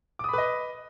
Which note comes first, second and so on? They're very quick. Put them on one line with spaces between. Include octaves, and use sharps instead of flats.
D6 D#6 B5 B4 D#5